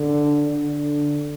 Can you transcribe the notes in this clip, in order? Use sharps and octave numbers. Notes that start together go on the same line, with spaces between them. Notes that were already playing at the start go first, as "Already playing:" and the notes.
Already playing: D3
D3